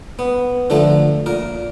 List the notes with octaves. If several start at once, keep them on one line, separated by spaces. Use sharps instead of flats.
B3
D3 F3 A3 A#5
A#2 A#4